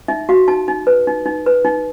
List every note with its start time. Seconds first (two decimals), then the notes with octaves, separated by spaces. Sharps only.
0.08 D#4 E5
0.29 F#4 F5
0.48 D#4 A5
0.68 D#4
0.87 B4
1.07 D#4
1.26 D#4
1.46 B4
1.65 D#4